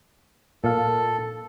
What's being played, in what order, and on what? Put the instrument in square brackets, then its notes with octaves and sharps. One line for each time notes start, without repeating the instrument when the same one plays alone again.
[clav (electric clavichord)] A#2 F5 [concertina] A4